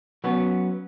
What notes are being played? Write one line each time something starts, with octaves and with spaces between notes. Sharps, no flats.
F#3 B3 C#4